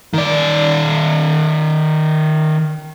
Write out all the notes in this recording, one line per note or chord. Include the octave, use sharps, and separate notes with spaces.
D#3 D5